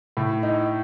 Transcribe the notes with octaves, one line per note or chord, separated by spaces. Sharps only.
A2
D#4